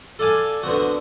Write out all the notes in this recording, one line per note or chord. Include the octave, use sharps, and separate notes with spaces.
A4 D5 F5 G#5 A5
D3 B3 C4 F#4